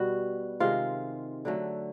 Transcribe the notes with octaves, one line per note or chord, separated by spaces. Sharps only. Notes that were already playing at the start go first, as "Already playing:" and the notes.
Already playing: B2 G3 F#4
C3 D#3 G#3 F4
D3 F#3 A3